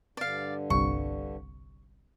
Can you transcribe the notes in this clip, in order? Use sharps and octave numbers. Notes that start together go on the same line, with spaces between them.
G2 D3 D5 F5
G1 C2 C#6